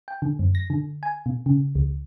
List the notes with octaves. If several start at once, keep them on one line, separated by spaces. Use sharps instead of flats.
G5
D3
F#2
A#6
D3
G#5
B2
C#3
C#2